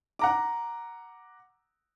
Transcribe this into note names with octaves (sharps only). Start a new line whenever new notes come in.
F#5 A#5 D6